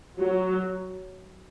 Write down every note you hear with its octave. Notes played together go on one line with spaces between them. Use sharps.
F#3